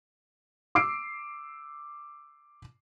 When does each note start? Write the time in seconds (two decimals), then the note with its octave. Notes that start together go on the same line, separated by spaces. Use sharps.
0.75 D6 E6 C7 D7